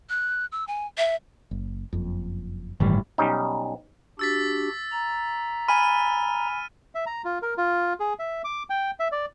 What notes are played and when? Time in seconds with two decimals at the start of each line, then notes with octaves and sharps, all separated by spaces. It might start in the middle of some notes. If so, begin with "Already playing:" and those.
0.10 F#6
0.52 E6
0.68 G#5
0.98 E5
1.51 F#1
1.93 F#1 F2
2.80 G1 A2 D#3 E3 G3
3.18 B1 G3 C#4 D#4
4.19 D4 F#4 G4 E6 A6 B6
4.92 A#5
5.68 G#5 B5 F6 D#7
6.95 E5
7.06 A#5
7.25 F4
7.42 A#4
7.58 F4
8.00 G#4
8.19 E5
8.44 D6
8.70 G5
9.00 E5
9.12 D5